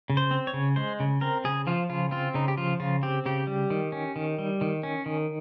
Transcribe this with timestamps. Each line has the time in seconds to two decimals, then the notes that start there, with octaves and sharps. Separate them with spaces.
0.10 C#3
0.17 C5
0.31 C4
0.47 C#5
0.54 C#3
0.76 G#3 C5
1.00 C#3
1.21 C4 A#4
1.44 C#3 G#4
1.67 F3 F4
1.89 C#3 F4
2.11 C4 F4
2.34 C#3 D#4
2.48 G4
2.57 F3 F4
2.80 C#3 F4
3.03 C4 G4
3.26 C#3 G4
3.47 G3
3.70 D#3
3.92 C#4
4.16 D#3
4.38 G3
4.61 D#3
4.83 C#4
5.06 D#3